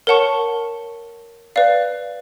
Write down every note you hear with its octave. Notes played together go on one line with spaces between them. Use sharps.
A#4 C#5 F#5 A5 C#6
B4 D5 F5